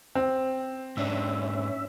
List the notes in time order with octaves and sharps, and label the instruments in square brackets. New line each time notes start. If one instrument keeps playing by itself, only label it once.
[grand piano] C4
[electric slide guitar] G#2 D4 [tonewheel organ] C#4 E5